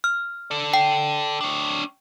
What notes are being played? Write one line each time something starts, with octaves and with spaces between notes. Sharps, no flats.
F6
A4 D5
G5
D4 C#5